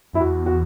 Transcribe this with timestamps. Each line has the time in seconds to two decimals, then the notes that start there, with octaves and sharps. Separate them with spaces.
0.13 F#2 E4
0.19 E2 F#4
0.46 F#4